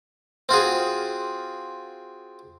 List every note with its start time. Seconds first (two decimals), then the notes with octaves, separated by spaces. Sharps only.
0.49 C4 F4 F#4 G#4